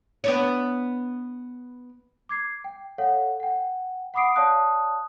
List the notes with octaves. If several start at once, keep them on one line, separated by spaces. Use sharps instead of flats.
B3 D4 C#5
D6 G#6 C7
G5
A4 C#5 F5 F#5
F#5 G5
F#5 B5 D6 D#6 C7 D7
C#5 D5 F5 A5 D#6 F#6